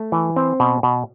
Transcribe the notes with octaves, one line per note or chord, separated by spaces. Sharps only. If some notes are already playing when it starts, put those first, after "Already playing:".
Already playing: A3
E3
C4
B2
B2